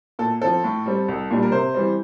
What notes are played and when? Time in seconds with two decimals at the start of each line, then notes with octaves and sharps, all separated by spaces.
0.19 A#2 A4
0.41 F3 C4 A4
0.64 A2
0.86 G3 C4
1.08 C2
1.31 A#2 G3 D4
1.43 A#4
1.52 C3 C5
1.74 E3 G3 C4